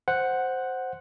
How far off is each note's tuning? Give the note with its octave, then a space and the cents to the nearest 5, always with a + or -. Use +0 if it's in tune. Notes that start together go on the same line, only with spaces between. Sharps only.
C5 +0 F#5 +0